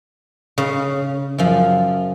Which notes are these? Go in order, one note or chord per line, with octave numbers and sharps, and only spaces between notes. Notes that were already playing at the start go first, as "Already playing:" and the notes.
C#3
F#2 F3